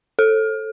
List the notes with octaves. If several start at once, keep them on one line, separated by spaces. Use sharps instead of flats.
A4